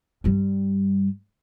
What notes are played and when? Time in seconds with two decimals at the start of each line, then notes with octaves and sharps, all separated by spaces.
0.24 G2 G3